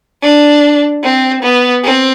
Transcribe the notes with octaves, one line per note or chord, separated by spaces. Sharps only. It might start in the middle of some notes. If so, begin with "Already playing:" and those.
D4
C4
B3
C4